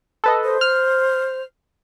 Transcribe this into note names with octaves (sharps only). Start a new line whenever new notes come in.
A4 B4 D#5
C5
F6